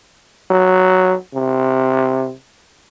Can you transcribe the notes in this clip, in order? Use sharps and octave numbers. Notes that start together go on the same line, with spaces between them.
F#3
C3